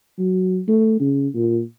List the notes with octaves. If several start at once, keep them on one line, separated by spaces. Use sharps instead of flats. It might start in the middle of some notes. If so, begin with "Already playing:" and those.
F#3
A3
C#3
A#2